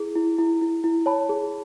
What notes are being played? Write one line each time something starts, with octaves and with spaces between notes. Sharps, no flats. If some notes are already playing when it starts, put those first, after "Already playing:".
Already playing: E4 G#4
E4
E4
E4
E4
C#5 A5 B5
G#4